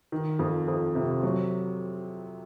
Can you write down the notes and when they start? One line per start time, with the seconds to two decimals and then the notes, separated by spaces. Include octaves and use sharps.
0.12 D#3
0.39 F2
0.68 F2
0.95 C3
1.23 F#3